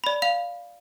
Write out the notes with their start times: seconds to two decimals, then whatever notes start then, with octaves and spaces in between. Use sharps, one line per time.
0.04 D5 B5
0.22 F5 F7